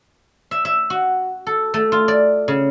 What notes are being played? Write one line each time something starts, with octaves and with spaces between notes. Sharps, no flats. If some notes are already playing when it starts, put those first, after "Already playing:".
E5
E5
F#4
A4
A3
F4
D5
C#3